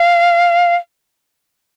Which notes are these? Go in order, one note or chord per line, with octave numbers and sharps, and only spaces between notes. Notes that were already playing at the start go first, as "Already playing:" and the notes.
Already playing: F5